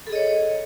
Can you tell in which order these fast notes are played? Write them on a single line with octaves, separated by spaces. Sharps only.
A4 G#4 D#5 C#5